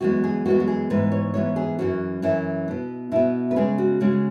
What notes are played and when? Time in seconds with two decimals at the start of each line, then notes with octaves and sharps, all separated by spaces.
0.01 F#2 E3 G#3 B3 F#4
0.24 G#4
0.45 F#2 E3 G#3 B3 F#4
0.60 F#4
0.67 G#4
0.90 G#2 E3 B3 B4
1.12 C#5
1.34 G#2 E3 B3 C#5
1.56 G#4
1.79 F#2 E3 C#4 F#4
2.22 F#2 E3 C#4 E4
2.68 B2 B3
3.12 B2 B3 E4
3.51 B4
3.56 C#3 G#3 C#4 G#4
3.78 F#4
4.00 C#3 G#3 C#4 F#4